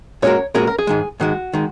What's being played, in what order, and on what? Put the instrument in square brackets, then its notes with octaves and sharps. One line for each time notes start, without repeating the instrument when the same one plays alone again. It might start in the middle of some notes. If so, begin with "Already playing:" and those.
[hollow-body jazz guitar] A#2 G#3 C#4 F#4 A#4 [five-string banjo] C#5
[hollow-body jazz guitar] A#2 G#3 C#4 F#4 A#4 [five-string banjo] G#4
[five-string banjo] A#4
G#4
[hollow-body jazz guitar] G#2 D#3 G#3
[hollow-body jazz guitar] G#2 D#3 G#3 [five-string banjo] F#4
[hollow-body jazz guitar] D#3 G#3